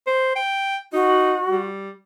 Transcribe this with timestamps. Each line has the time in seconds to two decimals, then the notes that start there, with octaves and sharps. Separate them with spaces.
0.07 C5
0.36 G5
0.93 D#4 F#4
1.48 G3